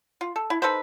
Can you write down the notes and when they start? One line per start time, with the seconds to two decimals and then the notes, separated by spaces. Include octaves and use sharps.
0.21 F4
0.36 A4
0.50 E4
0.62 D#4 A4 B4 C5